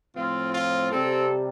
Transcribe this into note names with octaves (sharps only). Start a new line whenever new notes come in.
A2 F3 C4 F4
F4
C3 G3 C4 A4